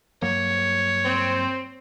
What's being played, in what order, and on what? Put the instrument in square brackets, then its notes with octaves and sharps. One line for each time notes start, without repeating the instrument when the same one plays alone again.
[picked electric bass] G2 F#3 A#3 [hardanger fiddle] C#5
[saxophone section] C4